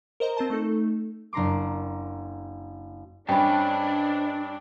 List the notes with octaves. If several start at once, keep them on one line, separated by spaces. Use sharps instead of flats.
A#4 C5 D#5 A#5
C4 F4 C5 A5
A3 D#4 A4
F#1 D4 A#5 C6 D6
G2 C#4 D4 C5 D#5 G5 A5 B5